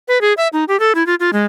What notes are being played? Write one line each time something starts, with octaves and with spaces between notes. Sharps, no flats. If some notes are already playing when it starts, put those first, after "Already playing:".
B4
G#4
E5
D#4
G4
A4
E4
F4
F4
G#3